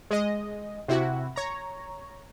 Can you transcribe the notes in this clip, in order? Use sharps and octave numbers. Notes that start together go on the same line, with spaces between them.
G#3 D#5
C3 E4 F#4
C#5 A#5